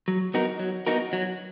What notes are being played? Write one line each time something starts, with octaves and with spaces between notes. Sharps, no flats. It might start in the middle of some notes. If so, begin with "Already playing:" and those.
F#3
B3 D#4 F#4 A#4
F#3
B3 D#4 F#4 A#4
F#3